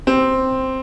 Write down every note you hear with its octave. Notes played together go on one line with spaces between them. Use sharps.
C4